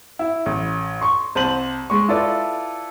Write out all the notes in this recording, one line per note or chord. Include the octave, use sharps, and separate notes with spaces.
E4
A1
C6 C#6
C2 C5 A5 D#7 F#7
G#3 C#6
E4 F4 A4 B4 D5